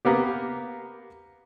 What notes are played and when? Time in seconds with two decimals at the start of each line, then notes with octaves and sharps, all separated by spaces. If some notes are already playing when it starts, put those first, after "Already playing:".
0.05 A#3 B3 G4